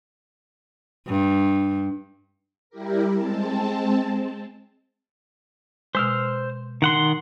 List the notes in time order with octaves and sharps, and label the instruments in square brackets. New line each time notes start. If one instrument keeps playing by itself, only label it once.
[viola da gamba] G2
[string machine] G3 E4 G4 A#4
G#3 C4 A5
[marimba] B2 G#3 [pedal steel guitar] C5 E6 F6
[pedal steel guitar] D#3 F#5 C6